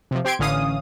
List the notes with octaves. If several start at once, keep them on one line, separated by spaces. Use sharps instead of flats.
C3 F3
C4 G4 C6 G#6 D7
A1 D3 E3 C#4 F5 D#6